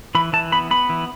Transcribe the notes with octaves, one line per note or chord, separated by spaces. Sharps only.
E3 B5
E3 A5
B3 B5
B3 B5
E3